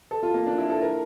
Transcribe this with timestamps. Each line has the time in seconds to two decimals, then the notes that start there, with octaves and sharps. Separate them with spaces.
0.11 A4
0.23 F4
0.34 A#3
0.47 D4
0.58 E4
0.70 A4
0.82 A#4